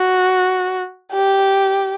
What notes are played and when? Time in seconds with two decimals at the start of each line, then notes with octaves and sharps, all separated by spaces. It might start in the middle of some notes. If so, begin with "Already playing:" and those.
Already playing: F#4
1.13 G4